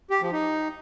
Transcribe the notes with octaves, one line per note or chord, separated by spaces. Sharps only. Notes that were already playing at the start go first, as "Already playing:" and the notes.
G4
F3
D#4